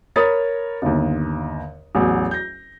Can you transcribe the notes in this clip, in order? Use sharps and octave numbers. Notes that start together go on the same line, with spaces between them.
A#4 C#5 B5 D#6 A6
G1 D#2
A1 E2 F#3
G6 A#6